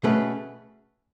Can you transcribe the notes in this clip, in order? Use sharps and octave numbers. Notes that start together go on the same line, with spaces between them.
B2 A3 C#4 G#4 B4